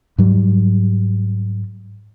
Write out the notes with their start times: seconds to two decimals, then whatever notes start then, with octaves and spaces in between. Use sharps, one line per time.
0.18 G#2 F#3 G3